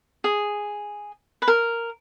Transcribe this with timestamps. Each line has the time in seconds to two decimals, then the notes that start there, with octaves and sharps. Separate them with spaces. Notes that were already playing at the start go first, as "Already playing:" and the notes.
0.24 G#4
1.42 B4
1.48 A#4